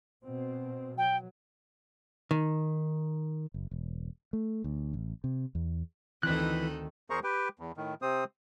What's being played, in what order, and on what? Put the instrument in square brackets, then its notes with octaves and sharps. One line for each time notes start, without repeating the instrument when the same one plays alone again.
[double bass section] B2 C4
[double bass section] F#3 [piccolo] G5
[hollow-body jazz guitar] D#3
[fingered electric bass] F#1
E1
A3
D2
A1
C3
E2
[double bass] D2 D#3 [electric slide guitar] E3 B4 [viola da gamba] C4 D#4 A4 [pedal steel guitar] F#6
[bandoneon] E2 G#4 A#4 C5 A#5 C#6
G4 B4 G5
E2
A2 D#3
C3 C4 C5 D#6